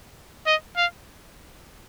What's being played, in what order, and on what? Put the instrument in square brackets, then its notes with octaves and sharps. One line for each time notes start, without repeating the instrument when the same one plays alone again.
[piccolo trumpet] D#5
F5